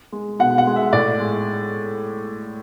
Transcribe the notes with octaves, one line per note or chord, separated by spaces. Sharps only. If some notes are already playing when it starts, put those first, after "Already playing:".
G#3
B2 F#5
F#5
G#3
E5
A2 D5
G#3